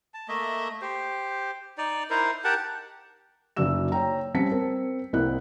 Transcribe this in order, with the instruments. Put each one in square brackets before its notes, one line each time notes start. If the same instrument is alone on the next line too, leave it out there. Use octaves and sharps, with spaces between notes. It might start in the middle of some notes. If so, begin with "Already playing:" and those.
[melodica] A5
A3 A#3 D#5 E5
G4 C5
D#4 D5
D#4 E4 A#4 C5
G4 A#4 F#5 A5
[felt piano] F#1 F#3 D#4 D5 E6 E7
C#5 G5 A#5
G3 C4 C#4 A5 B6 C#7
C4 A#4
C2 A#3 C4 E4 D#5 F#6